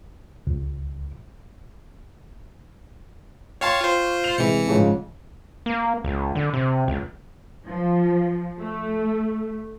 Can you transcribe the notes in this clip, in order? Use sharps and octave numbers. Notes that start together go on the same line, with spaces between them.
C#2
C#5 F5 G5 A5 C6 C#6
F4 C5
F7
C3 E3 G#3 C#7
G#2 C#3 F3
A#3
C#2
D3
C3
C#2
F3
A3